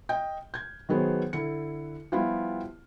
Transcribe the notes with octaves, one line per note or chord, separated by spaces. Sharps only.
D#5 G5 G6
G6 G#6
D#3 F#3 B3 G#4 B4 C5
D3 E4 C#7
F3 G3 B3 E4 F4 G4